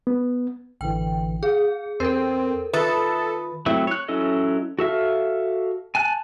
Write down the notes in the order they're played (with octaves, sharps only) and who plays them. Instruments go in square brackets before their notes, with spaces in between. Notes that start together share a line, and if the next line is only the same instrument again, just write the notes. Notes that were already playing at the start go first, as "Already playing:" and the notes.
[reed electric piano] B3
[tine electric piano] A1 D3 E3 [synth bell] G5
[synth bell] G#4 [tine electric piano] F5
[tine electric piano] E2 [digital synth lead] C4 [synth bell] A4 A#4
[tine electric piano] D#3 F4 [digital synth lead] A4 [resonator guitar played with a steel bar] B4 [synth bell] E5 D#6 A6
[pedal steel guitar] F#3 A3 C4 E4
C#5 F#6
F#3 C#4 E4 A4 D#5
F#4 A4 E5 F5
G#5 A5 F#6